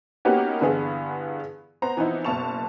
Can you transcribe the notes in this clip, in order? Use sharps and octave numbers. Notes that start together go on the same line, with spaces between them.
A#3 B3 C#4 D#4 F#4 G4
G2 D3 E3 B3 G#4
B3 C5 A#5
E3 F3 B3 C4 D#4 E4
F#1 B2 A5 C#6 F7